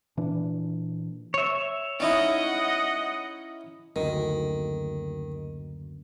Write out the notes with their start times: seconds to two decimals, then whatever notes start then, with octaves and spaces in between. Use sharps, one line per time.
0.17 A#2 E3 D4
1.34 C#5 E5
2.00 C#4 D#4 E4 D#5 F#5
3.96 F#1 D2 D#3